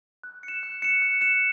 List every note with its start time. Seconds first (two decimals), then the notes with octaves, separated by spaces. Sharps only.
0.23 F#6
0.43 C#7
0.48 E7
0.63 F#6
0.82 C#7 E7
1.02 F#6
1.21 C#7 E7